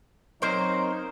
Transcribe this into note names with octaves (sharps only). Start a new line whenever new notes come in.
F#3 A#3 C4 D#4 A#4 C5